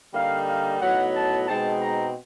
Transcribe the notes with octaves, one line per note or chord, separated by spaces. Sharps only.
D3 G3 A#3 D#4 F5
F5
A2 F#3 B3 D#4 F#5
A5
B2 G#3 C4 D#4 A5
A#5